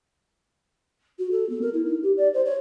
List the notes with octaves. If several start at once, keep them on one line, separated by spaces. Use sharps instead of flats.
F#4
A4
B3
A#4
E4
D#4
G4
D5
C5
C#5